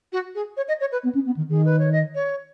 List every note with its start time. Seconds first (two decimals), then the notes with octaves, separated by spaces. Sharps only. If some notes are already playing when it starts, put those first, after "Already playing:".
0.13 F#4
0.35 G#4
0.57 C#5
0.68 D#5
0.81 C#5
0.92 B4
1.03 B3
1.14 C#4
1.26 B3
1.36 D#3
1.48 D#3 G#4
1.65 B4
1.79 C#5
1.92 D#5
2.15 C#5